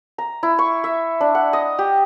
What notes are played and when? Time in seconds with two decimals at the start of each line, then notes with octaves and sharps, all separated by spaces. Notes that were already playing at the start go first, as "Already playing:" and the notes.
0.18 A#5
0.43 E4
0.59 C#6
0.84 E5
1.21 D4
1.35 F#5
1.53 D#5
1.79 G4